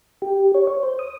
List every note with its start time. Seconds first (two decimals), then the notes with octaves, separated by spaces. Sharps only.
0.22 G4
0.55 C#5
0.67 C#5
0.83 C5
0.99 D#6